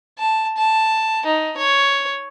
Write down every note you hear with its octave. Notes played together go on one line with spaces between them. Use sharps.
A5
A5
D#4
C#5